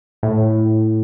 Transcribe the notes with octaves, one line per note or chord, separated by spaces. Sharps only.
A2